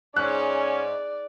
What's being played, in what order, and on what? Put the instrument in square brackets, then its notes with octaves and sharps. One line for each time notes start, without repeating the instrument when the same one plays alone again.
[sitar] G#2 [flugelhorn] C#4 [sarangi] D5 [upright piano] F#6